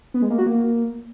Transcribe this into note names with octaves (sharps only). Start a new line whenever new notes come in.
B3
G#3
A#3
F#4
A#3